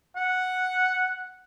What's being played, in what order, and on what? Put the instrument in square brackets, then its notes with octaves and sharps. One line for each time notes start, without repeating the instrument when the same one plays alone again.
[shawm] F#5